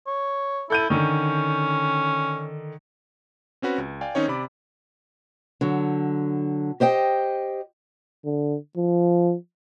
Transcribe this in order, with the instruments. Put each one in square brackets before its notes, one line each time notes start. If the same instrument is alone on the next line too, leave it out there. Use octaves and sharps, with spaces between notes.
[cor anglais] C#5
[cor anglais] E4 [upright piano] A4 G6 D#7
[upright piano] D3 D#3 [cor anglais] C#4
[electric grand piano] C4 C#4 F#4 B4
C#2
D5 F5 G5 G#5
D#3 C4 C#4 D#4 C#5
C3 D5 B5 D6
[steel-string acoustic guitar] D3 F#3
G4 C5 D#5 G5
[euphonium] D3
F3